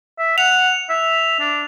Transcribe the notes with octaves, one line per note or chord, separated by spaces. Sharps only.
E5
F#5 F7
E5
D4